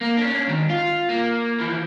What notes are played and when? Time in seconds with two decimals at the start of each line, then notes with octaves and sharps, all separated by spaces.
0.01 A#3
0.17 C#4 D4
0.48 G#2 D#3
0.70 F4
1.09 A#3
1.60 E3 F3